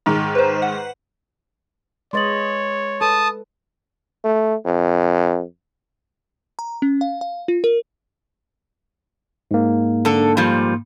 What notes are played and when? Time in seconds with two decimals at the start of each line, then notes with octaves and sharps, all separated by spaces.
0.06 G#2 D#3
0.35 B4 C5
0.62 F#5
2.13 G#3 B4 C#5 D#5 C6 A6 F#7
3.01 A4 B4 A5 D#6
4.24 A3
4.66 F2
6.59 A#5
6.82 C#4
7.01 F5
7.21 F5
7.48 F4
7.64 A#4
9.51 G#2 A#3
10.05 D3 A4
10.37 A#2 F3 G3